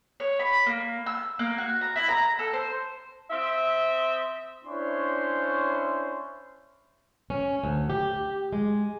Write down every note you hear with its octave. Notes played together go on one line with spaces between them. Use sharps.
C#5
B5
A#3
E6
A#3
F#4
A#5
E4
A#5
A4
C5
C4 D#5 E5
C#4 D4 E4 C5 C#5 C6
C#4
D2
G4
G#3